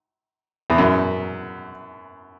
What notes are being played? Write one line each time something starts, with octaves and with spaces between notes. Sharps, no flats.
E2
F#2